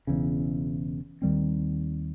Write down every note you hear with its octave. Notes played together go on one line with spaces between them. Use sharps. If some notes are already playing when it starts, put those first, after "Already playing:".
E1 E2 C#3
D#2 D#3 G3 C4